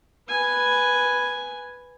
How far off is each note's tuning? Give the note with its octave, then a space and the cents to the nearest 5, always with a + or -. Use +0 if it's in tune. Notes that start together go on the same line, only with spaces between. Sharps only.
B4 +0 G#5 +0